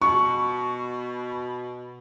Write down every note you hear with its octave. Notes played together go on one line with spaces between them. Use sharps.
B2 C#6